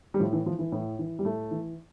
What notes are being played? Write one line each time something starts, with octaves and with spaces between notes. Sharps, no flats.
G3
A2 F3
E3
E3 F3
E3
A2
E3
G3
A2 A3
E3